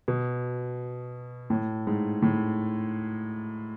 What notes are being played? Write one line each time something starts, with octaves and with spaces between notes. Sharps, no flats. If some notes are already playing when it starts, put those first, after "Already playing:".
B2
A2
G#2
A2